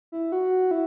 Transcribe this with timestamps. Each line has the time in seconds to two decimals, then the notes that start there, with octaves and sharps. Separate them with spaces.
0.12 E4
0.32 F#4
0.71 E4